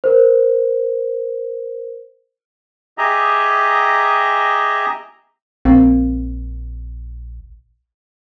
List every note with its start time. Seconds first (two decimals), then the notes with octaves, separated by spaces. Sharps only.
0.04 A#4 C5
2.98 G4 G#4 D#5 E5 A#5
5.65 A#1 A#3 C4